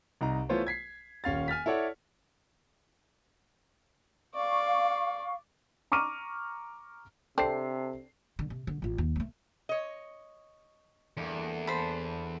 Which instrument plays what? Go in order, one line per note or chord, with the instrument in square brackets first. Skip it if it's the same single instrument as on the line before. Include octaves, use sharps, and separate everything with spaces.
[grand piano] C2 D#4 A#5
E3 A3 B3 F4 C5 C#5
G#6 B6 C7
D#1 C#4 F5 A6
G#5 F6 A6 B6
E4 A4 C#5 D5 F#5
[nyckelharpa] D5 [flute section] F5 C#6
[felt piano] A#5 C#6 D6 F6 D#7
[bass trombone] C3 [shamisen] C4 D4 [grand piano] A4 C7
[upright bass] D3
C3
D3
A1 F4
D#2
F#3 A3
[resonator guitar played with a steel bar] C#5 D#5
[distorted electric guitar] E2 [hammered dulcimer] D3 G3 A#3
[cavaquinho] C5 B5 [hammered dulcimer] A5